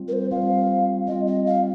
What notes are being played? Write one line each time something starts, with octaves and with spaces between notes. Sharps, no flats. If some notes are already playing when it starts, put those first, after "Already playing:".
Already playing: G3 C4 F4
A#4
C5
G3 C4 F4 F5
G3 C4 F4 D#5
D#5
F5